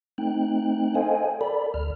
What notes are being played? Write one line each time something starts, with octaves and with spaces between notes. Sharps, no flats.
A3 C4 D#4 G5 F#6
A4 C5 D#5 F5 G5 G#5
A4 A#4 D5 B5
D2 F6